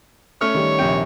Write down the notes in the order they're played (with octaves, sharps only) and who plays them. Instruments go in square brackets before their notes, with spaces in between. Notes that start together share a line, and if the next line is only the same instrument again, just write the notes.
[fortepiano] A3 C#4 F6 [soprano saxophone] C#5
[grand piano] D#3 G3
[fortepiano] A#1 C3 G5